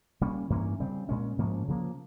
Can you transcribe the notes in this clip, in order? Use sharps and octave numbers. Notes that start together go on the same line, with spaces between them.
C#3 G3 A#3 C#4
G2 E3 A#3 C#4
C#3 G3 C4
A#2 G#3 C#4
G#2 F3 A#3 C#4
C#3 F3 A#3